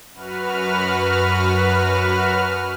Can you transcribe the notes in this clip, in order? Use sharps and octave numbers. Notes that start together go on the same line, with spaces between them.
F#2 F#4 B4 F6